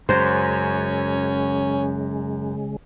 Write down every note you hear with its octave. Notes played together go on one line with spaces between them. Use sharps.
F#2 C#3 G#3 C#4 C5